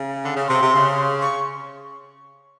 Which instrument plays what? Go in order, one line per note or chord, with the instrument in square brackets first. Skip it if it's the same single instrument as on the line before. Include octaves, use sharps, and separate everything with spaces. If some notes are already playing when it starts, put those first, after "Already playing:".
Already playing: [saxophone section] C#3
D3
C#3
[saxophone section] C3 [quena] C6
[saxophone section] C3
C#3
[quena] C#6